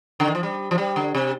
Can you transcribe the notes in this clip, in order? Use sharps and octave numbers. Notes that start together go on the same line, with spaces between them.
D3
D#3
F3
G3
F3
G3
D3
C3